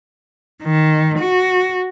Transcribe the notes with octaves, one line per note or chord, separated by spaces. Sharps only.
D#3
F#4